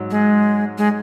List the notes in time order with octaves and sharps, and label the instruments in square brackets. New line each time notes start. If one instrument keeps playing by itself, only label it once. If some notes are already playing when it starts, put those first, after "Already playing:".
Already playing: [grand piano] G#2 F#3
[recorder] G#3
G#3